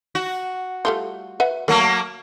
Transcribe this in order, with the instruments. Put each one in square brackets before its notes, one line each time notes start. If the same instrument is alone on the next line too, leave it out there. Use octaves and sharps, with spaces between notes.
[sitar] F#4
[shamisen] G3 A3 F4
B4 E5 F#5
[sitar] F#3 A3 A#3 [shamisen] A#4